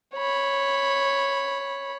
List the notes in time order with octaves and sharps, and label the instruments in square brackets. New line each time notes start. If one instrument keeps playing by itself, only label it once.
[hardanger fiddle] C#5 B5